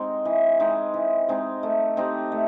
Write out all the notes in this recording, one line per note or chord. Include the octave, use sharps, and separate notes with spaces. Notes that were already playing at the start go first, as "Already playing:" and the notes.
Already playing: G#3 C4 D#4
E3
G#3 C4 D#4
E3
G#3 C4 D#4
A3
C4 D#4 G4
A3